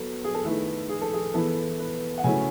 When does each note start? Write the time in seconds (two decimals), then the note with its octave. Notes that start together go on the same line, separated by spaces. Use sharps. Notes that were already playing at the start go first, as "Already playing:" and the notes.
Already playing: F#3 B3 A4
0.24 G#4
0.34 A4
0.44 D#3 A3 E4 B4
0.89 G#4
1.01 A4
1.13 G#4
1.34 E3 B3 E4 A4
1.79 B4
2.18 F#5
2.24 C#3 F#3 A3 C#4 E4 G#5